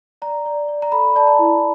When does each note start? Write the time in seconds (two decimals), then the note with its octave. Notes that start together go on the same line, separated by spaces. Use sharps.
0.22 D5 A#5
0.46 D5
0.68 D5
0.82 A#5
0.92 A4 B5
1.16 D5 A5
1.27 A#5
1.39 E4